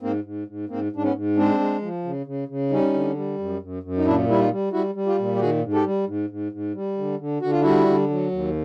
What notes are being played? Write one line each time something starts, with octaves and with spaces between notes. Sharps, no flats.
G#2 A#3 C4
G#2
G#2
G#2 A#3 C4
G#2 D4
B3 C#4
G#2
G#3 C4 D4
G#3
F3
C#3
C#3
C#3
G3 C#4 D#4
D3
G3
F#2
F#2
F#2
D#4
A#2 D4 E4
G3 E4
D#4 F4
G3
G3 E4 F#4
G3
F4 G4
A#2
G4
D#3 F#4 G#4
G#2
G4 A4
G3
G#2
G#2
G#2
G3
D3
D3
D3 F#4
F4
G3 E4 F#4
D3
F#3
D#2